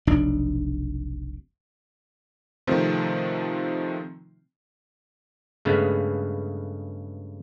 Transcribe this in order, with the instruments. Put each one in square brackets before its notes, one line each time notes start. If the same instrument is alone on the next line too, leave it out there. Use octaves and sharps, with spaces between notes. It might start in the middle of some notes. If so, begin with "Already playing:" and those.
[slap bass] F1 B1 D4
[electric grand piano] C3 D#3 F3 A3 C4
[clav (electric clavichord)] G2 C#3 G#3 A3 B3